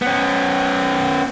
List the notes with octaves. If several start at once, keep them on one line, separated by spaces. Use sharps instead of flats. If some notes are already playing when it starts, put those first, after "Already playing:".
B3 C#4